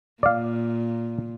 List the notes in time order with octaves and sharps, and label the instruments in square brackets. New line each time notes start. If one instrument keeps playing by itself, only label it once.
[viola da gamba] A#2 [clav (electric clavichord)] D5 F5